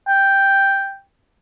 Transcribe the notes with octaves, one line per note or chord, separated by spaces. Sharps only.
G5